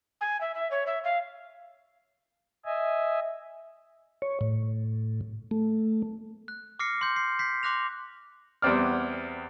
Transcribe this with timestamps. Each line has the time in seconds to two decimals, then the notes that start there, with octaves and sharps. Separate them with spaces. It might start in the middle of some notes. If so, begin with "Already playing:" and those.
0.21 G#5
0.41 E5
0.55 E5
0.71 C#5
0.87 E5
1.04 F5
2.65 D#5 E5 G#5
4.22 C#5
4.41 A2
5.51 A3
6.48 F#6
6.79 D6 F6 A#6 C7 C#7
7.01 C6 G6
7.16 C7
7.39 G6 B6 C7
7.63 C6 D6 F#6 A#6 F7
8.62 E2 G3 B3 C4 D5 F6